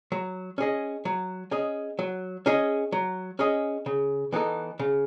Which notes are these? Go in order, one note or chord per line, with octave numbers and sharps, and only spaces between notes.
F#3
C#4 G#4 D#5
F#3
C#4 G#4 D#5
F#3
C#4 G#4 D#5
F#3
C#4 G#4 D#5
C#3
E3 B3 D#4 A4
C#3